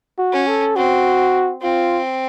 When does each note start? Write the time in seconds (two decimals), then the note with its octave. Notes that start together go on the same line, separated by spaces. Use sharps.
0.19 F#4
0.32 C#4
0.47 A4
0.76 C4 F#4
1.62 C4 F4